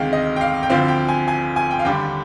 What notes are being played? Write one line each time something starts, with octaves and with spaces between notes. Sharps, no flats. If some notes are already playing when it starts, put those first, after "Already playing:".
Already playing: D2 C3 D#3 G#3 D4 F5 G5
D#5
G5
F5
G5
D2 D3 F3 C4 F5
G5
G#5
G#5
G#5
G5
F5
D#2 D3 G3 D4 G5